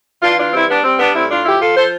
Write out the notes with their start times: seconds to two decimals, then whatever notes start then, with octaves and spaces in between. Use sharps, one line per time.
0.22 E3 D4 F4
0.38 D4 F4
0.53 G3 C4 E4
0.68 B3 D4
0.84 G3 C4
0.99 B3 D4
1.14 A2 C4 E4
1.30 D4 F4
1.45 F3 E4 G4
1.60 F4 A4
1.76 F3 A4 C5